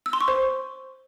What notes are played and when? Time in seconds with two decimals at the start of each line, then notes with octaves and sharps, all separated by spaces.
0.06 E6
0.13 C6
0.21 C#6
0.28 C5